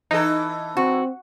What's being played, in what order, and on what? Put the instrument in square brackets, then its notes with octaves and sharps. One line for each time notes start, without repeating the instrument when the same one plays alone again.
[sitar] E3 A4 [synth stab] D#4
[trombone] C4 [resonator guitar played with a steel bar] F#4